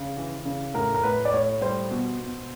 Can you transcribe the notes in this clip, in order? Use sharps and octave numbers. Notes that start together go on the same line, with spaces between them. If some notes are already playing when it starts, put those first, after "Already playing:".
Already playing: C#3
E3
C#3
A2 A#4
A#4
A2 B4
D5
A2 C#5
G3 C5
B2
B2